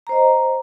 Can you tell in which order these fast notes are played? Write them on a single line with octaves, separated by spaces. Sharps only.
A#5 C5 D#5